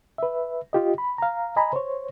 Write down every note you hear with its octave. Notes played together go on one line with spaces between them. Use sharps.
B4 E5
F4 G4 D#5
B5
F5 A#5
D#5 G#5 A#5 B5
C5 C#5